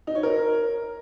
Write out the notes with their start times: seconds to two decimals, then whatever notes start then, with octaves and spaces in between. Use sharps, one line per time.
0.07 D#4
0.15 C#5
0.23 A#4